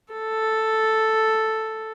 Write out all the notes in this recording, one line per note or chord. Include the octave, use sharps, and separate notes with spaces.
A4